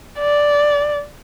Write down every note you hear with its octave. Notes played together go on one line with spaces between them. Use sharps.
D5